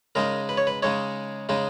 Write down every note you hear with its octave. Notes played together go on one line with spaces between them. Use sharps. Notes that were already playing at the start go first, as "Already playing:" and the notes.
C#3 G#3 D#4 A#4
B4
C#5
B4
C#3 G#3 D#4 C#5
C#3 G#3 D#4